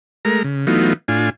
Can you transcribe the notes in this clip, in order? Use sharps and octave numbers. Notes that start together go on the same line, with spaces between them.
G#3 A3 A#4 A#5
C#3
E3 F#3 A3 B3 D#4 F4
A2 D4 F4 G#5